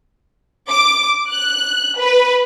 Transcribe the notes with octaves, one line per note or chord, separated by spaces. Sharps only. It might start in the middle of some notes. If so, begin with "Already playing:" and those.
D6
F#6
B4